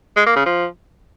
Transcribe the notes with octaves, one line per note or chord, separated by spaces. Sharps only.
G#3
A#3
C#3
F3